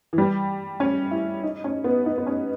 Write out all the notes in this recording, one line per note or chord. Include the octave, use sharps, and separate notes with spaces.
E3
G3
C#4
E4
D#4
C#4
B3
D#4
B3
C#4